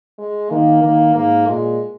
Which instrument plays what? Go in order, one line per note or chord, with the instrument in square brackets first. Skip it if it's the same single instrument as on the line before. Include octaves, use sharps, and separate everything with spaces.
[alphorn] G#3
[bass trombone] D#3 [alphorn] A#3
[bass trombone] D#3 [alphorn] A#3
[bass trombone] G#2 [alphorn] A#3
[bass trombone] A#2 [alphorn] G#3